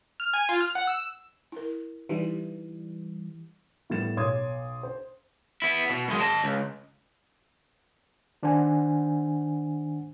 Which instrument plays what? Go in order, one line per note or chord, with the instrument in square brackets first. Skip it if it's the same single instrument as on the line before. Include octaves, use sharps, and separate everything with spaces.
[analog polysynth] F6
G#5
F4
F6
F#5
E6
[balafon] E4 A#4
[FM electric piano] E3 G3 [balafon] D#4 G4
[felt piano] A2 G3 B3 A6 E7
B1 C#5 C6 D6 D#6 G#6
C5
[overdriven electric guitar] B3 E4
B2
F#2 G#3
D#5 A5
C#2
[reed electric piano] D#3 D4 C5 F#5 G#5